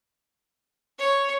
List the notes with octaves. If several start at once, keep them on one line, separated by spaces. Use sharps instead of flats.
C#5